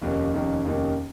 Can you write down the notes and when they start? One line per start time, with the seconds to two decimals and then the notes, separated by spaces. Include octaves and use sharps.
0.02 F1 D#2 D#3 A#3 C#4
0.33 F1 D#2 D#3 A#3 C#4
0.64 F1 D#2 D#3 A#3 C#4